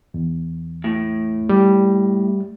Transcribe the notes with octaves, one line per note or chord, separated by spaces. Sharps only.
E2
A2
G3